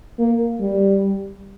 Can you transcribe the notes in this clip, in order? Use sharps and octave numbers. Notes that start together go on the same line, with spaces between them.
A#3
G3